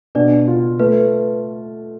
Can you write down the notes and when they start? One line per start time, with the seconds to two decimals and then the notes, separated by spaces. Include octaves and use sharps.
0.15 B2 D4 D5
0.48 F4
0.80 A3 B4